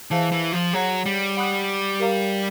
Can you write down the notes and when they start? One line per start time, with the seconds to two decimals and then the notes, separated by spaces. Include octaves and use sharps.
0.11 E3 G#4 C5 F5 A5
0.32 E3
0.53 F3
0.73 F#3 G#4 C#5 F#5
1.06 G3
1.37 F#5 B5 D#6 F#6
1.99 G4 A#4 D5 F5 A#5